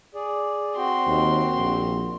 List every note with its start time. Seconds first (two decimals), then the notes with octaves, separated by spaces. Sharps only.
0.15 G#4 D5
0.76 C4 F#4 G5 C6
1.07 D#2
1.56 A#1